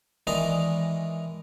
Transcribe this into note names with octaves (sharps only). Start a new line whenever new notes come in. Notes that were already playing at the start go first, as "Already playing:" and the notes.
D#3 E3 G#3 D4 D#5 A#5